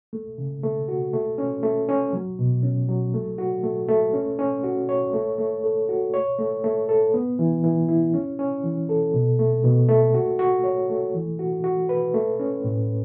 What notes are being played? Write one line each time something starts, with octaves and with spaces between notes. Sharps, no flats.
A3
C#3
A3
F#4
A3
C#4
A3
C#4
F#3
B2
C#4
F#3
A3
F#4
A3
A3
C#4
C#4
F#4
C#5
A3
A3
A4
F#4
C#5
A3
A3
A4
B3
E3
E3
E4
C#4
C#4
E3
A4
B2
A3
B2
A3
F#4
F#4
C#5
A3
E3
F#4
F#4
B4
A3
C#4
A2